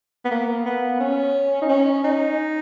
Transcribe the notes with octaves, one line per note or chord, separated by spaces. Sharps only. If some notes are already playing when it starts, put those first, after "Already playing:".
B3
A#3
B3
C#4
D#4
C#4
D#4